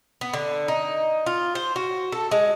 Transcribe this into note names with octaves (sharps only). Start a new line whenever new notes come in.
B3
D3
D#4
F4
C5
F#4
A4
G#3